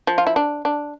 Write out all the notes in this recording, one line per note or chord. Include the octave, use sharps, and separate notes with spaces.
F3
F4
E4
D4
D4